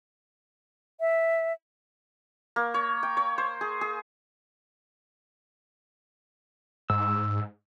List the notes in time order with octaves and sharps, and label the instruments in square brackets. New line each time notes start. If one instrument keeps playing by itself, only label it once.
[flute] E5
[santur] A#3
C#5
G5
C#5
C5
G#4
G#4
[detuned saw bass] G#2 [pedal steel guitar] E6